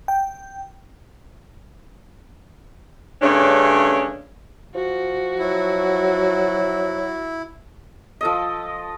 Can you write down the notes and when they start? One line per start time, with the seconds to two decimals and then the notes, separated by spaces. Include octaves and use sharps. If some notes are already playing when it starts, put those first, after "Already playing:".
0.08 G5
3.22 G2 C#3 A3 C#4 D4
4.75 F3 F#4
5.39 F#3 E4
8.21 F3 A4 D#5